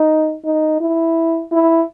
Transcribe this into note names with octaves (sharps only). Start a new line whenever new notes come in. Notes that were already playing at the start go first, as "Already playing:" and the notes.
Already playing: D#4
D#4
E4
E4